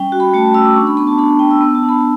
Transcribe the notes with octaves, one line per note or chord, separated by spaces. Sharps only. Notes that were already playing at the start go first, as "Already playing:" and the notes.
Already playing: G3 C#4 G5
F#4
B5
A3 A5
C#4 E6
D6
D4 C#6
B5
B3 B5
A5
D4 B5
A5
B3 G5
E6
B3
A5
D4
B5